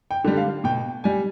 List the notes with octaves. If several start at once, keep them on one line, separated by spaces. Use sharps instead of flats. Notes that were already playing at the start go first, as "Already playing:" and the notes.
G5
D3 G3
F5
B2 G5
G3 G#5